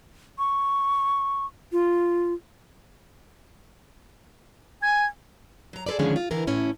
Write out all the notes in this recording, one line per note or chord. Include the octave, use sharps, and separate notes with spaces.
C#6
F4
G#5 G#6
F#3 A#5
G#4 A4 B4 C5 D5
D3 D#3 F3 G#3 C#4 G#4
F4
D3 E3 B3 A#4
A2 C#4 E4